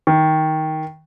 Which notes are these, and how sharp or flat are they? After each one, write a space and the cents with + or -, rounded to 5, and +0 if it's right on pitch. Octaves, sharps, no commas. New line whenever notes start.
D#3 +10